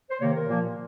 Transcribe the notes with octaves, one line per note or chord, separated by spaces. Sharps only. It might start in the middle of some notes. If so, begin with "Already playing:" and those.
C5
C3 D#3 A#3 C#5
A#4
A#2 F3 A#3